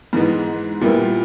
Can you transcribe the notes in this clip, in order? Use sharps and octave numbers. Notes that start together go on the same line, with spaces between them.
G#2 E3 G#3 B3
A#2 G3 B3 E4